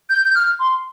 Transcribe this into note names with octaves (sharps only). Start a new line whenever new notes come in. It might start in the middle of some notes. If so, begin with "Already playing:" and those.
G6
G6
F6
C6